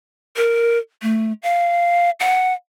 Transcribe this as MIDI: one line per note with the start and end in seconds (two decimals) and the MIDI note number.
0.36 0.78 70
1.02 1.33 57
1.43 2.10 77
2.20 2.54 78